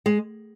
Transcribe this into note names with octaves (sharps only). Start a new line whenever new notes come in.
G#3